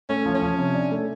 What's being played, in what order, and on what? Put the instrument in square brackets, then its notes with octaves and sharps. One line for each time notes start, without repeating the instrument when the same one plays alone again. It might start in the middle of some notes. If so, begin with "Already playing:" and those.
[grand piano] A3 [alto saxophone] C#4
[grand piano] F3
[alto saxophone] C#4
[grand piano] F3
C3
D4
A3